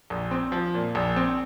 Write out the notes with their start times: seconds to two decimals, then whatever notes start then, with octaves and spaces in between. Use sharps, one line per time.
0.10 A#1
0.31 C4
0.52 F3
0.74 A#2
0.95 A#1
1.16 C4